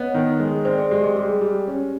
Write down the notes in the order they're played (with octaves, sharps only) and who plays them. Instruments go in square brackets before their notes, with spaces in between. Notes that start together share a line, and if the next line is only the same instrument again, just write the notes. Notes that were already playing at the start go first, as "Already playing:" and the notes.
Already playing: [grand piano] B3 [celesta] C#5 D#5
[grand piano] D#3
G#3
[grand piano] C4 [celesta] C5 D5
[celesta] G#4
[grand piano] G#3 [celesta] G4
[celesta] G#4
[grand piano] G3 [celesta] G#4
[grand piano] G3
C#4